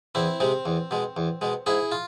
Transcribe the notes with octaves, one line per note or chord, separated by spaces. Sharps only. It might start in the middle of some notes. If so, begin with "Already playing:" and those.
E2 C4 E4
C3 G#3 C4
E2
B2 G#3
E2
B2 G#3
G#2 E4 G#4
F4